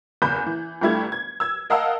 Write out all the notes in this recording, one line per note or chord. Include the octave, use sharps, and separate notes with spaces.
F#1 E2 B5 G6
E3
G1 D3 G3 A3 E4 G#6
G#6
E6 G#6
A#4 D#5 F5 F#5 A5 E6